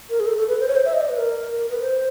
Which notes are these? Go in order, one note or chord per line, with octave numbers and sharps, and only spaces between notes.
A#4
G#4
A4
A4
B4
C5
C#5
C5
E5
D#5
D5
B4
A#4
A#4
B4
C5